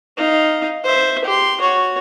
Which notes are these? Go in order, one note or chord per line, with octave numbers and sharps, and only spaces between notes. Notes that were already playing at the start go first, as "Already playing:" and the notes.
D#4 F5
C5 E5
G4 C6
F#4 C#5